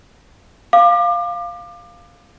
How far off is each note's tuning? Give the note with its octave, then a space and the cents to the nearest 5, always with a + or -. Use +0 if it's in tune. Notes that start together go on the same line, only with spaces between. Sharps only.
F5 +0 D6 +30